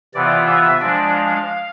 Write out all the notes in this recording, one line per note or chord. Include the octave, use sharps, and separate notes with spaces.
C3 E3 B3 F4 D5
E5
F3 G#3 D4 D5
F5